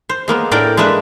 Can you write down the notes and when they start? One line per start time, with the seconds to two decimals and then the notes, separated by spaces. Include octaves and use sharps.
0.09 C5
0.28 G#3 A#3 B3
0.51 A2 D4 A#4 D5 G5
0.77 G#3 A#3 D4 B4 E5